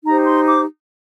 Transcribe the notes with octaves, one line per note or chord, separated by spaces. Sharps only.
D#4 G4 C5 A#5
C6
D6